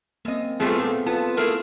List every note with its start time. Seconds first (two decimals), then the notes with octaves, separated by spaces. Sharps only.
0.25 F#2 A#3 C4 D#5
0.60 A2 G3 A3 B3 C4 F4 G#4
0.79 A#2 A4
1.06 B3 F4 A5
1.37 A3 E4 G#4 A#4